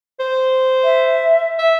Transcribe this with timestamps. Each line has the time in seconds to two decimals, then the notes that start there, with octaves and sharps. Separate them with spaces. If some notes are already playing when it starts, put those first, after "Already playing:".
0.19 C5
0.84 E5
1.58 E5